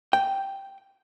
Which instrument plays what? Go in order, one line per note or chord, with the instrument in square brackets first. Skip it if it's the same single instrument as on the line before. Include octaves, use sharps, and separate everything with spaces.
[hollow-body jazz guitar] G5